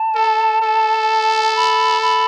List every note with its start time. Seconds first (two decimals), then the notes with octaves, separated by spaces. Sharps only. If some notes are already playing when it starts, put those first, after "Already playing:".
Already playing: A5
0.15 A4
0.62 A4
1.56 B5
2.02 B5